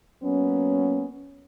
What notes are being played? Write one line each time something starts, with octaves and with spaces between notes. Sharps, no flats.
F#3 A#3 B3 C#4